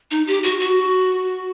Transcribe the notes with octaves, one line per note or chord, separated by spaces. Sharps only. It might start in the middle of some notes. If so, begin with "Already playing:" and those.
D#4
G4
F#4
F#4